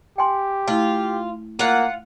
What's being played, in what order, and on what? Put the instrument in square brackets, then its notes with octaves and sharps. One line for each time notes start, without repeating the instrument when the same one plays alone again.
[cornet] G4 [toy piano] G5 G#5 C6
[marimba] A3 E4 [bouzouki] F4
[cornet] A#3 [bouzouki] F4 F#5